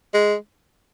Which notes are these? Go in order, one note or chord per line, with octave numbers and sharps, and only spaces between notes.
G#3